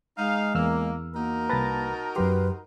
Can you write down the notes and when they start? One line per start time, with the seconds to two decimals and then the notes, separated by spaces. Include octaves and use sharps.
0.18 G#3 D#4 F5
0.55 E2 A#3 E6 F6
1.14 A#3 D#4 F#4 A#4
1.50 C2 B4 A5 A6 A#6
2.16 F#2 F#3 G4 B4 C6